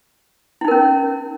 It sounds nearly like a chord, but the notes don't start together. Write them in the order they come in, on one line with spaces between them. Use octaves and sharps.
E4 D#4 A#4 C#4